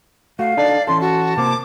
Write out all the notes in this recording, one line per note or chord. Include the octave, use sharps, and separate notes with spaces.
A3 F#4 F5
D4 D#4 A4 D5
E3 C#4 A4 C6
F#4 A5
C3 A#3 C5 D6